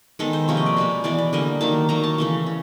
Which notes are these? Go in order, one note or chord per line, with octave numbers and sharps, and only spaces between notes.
D#3 G#3 B3 A4
C5
C3 F3 A#3 C#5
D#5
D5
B2 G#3 B3
E3 G#3 B3 D5
D5
D3 G3 A#3 D#5
D#3 F#3 A#3 A5
D#3 F#3 A#3 A#5
A5
C#3 E3 A3
C#3